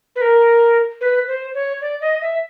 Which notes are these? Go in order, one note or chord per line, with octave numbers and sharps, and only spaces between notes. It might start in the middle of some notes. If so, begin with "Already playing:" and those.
B4
A#4
B4
C5
C#5
D5
D#5
E5